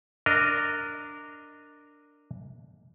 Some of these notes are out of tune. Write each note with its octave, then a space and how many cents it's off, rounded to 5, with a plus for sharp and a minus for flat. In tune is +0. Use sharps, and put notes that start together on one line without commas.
D4 +0 A#4 -15 D#5 +0